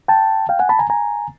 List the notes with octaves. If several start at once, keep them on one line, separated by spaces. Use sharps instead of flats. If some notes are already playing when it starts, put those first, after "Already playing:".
G5 A5
F5 G5
F#5 G#5
A5 B5
G#5 A#5
G#5 A#5